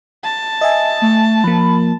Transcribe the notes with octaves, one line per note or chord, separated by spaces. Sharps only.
A5
D#5 E5 G#5
A3
F3 A#3 B5